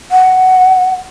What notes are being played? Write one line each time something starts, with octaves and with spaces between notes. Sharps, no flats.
F#5